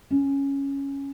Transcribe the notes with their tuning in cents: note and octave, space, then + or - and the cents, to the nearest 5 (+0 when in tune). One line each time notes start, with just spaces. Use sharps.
C#4 +0